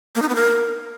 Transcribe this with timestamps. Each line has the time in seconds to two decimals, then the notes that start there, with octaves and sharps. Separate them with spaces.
0.16 A#3
0.22 D#4
0.29 B3
0.35 A#4